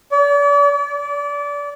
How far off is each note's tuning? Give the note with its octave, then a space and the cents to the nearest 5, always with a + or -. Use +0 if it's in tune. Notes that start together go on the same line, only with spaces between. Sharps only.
D5 -40
D5 -25